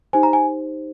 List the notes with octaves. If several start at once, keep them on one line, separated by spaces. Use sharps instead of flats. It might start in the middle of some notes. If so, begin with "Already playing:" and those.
D#4 G4 C5 G#5
A#5
G#5